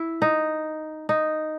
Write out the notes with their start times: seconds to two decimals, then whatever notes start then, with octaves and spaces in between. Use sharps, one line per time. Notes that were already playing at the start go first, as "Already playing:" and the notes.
Already playing: E4
0.22 D#4
1.09 D#4